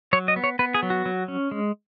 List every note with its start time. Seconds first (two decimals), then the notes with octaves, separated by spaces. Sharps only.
0.13 F#3 C#5
0.28 D#5
0.36 B3
0.44 C#5
0.59 B3 B4
0.74 G#4
0.83 F#3
0.90 F#4
1.06 F#3
1.28 C#4
1.51 G#3